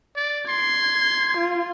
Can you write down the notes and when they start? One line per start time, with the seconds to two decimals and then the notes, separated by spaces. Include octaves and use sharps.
0.16 D5
0.49 C6 G#6
1.37 F4